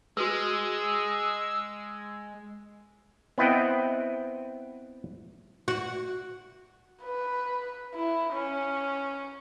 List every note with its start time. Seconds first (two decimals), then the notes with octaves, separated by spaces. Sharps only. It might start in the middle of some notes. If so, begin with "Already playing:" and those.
0.17 G#3 F#4 G#4 B4 E6
3.38 B3 C4 E4 D#5 F#5 G5
5.68 F#4
7.03 B4
7.95 E4
8.33 C#4